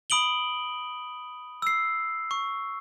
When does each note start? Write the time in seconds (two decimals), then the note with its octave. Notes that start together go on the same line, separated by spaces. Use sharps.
0.10 B5 D#6 D7 F#7 G7
1.62 E6 C7
2.31 C#6